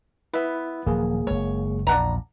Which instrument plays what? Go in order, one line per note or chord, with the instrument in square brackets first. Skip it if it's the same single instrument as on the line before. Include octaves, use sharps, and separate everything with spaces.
[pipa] B3 [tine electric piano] E4 E5
[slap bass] D#1 F3 F#3 [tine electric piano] A#3 G#4
[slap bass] F#1 G#3 [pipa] C#5
[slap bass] A#1 E2 A#2 [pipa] D4 F#5 A#5